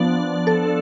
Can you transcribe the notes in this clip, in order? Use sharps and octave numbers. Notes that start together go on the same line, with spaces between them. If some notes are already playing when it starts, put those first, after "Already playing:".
Already playing: F3 B3 D4 D5
A4